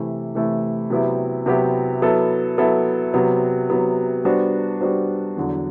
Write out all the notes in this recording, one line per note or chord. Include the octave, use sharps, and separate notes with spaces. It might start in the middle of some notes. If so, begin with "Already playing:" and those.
Already playing: C3 E3 A3 E4
C3 E3 A3 E4
C3 F#3 B3 E4 G4
C3 F#3 B3 E4 G4
F#3 B3 E4 A4
F#3 B3 E4 A4
C3 F#3 B3
C3 F#3 B3
G3 B3 D4 F#4 C5
G3 B3 D4 F#4 C5
E2 D3 F#3